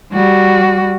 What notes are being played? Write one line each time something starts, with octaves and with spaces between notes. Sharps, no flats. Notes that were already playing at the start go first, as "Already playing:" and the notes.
G3 F#4